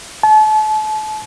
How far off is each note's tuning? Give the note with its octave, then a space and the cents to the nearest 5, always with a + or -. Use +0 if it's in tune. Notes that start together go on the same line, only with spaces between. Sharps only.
A5 -35